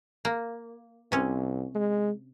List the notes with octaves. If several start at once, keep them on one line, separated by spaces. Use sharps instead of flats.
A#3
C2 C3 C#4
G#3